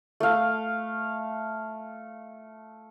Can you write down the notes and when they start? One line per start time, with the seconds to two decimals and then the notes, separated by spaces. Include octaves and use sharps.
0.20 A3 F5